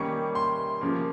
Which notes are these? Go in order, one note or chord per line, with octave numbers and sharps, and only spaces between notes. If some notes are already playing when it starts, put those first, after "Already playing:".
Already playing: D#3 G3 A#3 C#4 C#6
C6
C#3 F3 A#3